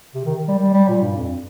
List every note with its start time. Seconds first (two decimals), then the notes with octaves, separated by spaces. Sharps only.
0.14 C3
0.25 D#3
0.48 G3
0.59 G3
0.74 G3
0.88 A#2
1.02 G2
1.15 F2